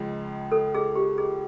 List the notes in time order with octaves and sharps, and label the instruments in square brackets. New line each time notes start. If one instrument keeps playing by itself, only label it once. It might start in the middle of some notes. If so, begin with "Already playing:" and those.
Already playing: [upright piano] C#2 C#3 F3 G#3
[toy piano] A4
G#4
G4
G#4